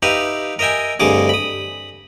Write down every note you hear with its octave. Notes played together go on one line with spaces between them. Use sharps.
D#4 G4 B4 E5 F5
A#4 D#5 E5 G5 G#5
D2 G2 C3 G#4 D#5 D6
B5 D#6